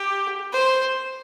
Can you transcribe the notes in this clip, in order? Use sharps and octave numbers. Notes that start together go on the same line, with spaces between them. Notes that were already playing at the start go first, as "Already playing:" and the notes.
Already playing: G4
C5